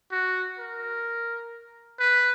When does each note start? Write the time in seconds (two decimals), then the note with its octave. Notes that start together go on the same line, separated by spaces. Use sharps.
0.12 F#4
0.59 A#4
1.99 B4